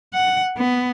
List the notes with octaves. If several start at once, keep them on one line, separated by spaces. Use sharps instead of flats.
F#5
B3